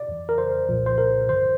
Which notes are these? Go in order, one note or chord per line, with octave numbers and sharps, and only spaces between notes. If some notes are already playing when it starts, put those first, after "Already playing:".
Already playing: D5
F2 E3
A#4
C5
C2 A#2 F3
C5
A#4
G2 D3 F3 C5